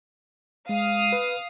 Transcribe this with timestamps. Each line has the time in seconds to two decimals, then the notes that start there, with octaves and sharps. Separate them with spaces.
0.69 G#3 F5 D#6
1.12 B4